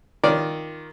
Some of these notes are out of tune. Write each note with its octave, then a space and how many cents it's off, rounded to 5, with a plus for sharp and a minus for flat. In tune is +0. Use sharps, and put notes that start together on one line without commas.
D#3 +5 F4 +0 D5 +0